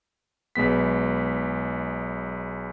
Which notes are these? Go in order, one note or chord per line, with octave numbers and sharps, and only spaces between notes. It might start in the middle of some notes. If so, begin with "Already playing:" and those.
B1 G#3 B3 B6